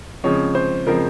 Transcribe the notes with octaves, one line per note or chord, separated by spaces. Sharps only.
C#3 F3 G#3 C4 C#5
C5
C#3 F3 G#3 C4 A#4